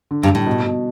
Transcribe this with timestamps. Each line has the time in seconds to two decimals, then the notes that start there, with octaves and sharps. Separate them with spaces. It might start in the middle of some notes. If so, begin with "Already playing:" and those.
0.11 D3
0.23 G2
0.29 G3
0.35 A2
0.46 B2
0.66 B2